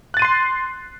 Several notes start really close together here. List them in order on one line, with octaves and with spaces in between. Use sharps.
F#6 A6 D#7 C6 C7